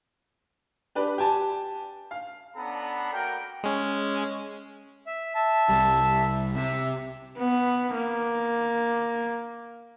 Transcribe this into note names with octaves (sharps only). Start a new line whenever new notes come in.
D4 G4 B4 D5
G4 G#5 A5
F5
B3 C#4 D4 A4 A#5 B5
A#3 F#4 A#4 G5
G#3 C#4
E5
E5 A5
C2 G3
C3 E5
B3
A#3